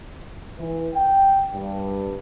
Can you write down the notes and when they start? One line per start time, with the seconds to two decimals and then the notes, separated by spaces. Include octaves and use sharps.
0.58 E3
0.95 G5
1.54 G2